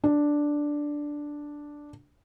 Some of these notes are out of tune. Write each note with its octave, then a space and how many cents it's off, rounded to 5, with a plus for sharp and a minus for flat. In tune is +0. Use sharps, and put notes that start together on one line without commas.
D4 +0